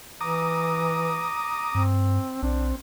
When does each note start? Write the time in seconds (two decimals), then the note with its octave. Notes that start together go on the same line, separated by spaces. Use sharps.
0.21 E3 A#5 D6 D#6
1.75 G2 C4
2.43 B1 C4 D4